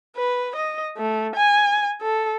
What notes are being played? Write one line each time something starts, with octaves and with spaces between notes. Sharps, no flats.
B4
D#5
A3
G#5
A4